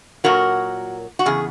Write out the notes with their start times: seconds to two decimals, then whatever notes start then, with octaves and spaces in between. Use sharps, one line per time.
0.24 A#2 F#3 F#4 A#4
1.19 F#4
1.26 E2 C#3 G#4